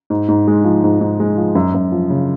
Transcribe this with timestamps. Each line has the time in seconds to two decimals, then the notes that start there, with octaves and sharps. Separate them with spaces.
0.10 G#2
0.28 G#2
0.48 G#3
0.64 F3
0.84 G#2
1.01 G#2
1.20 G#3
1.37 F3
1.55 F#2
1.74 F#2
1.92 F3
2.10 C#3